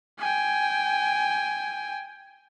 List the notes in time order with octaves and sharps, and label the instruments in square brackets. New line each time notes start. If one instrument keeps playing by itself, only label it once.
[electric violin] G5 G#5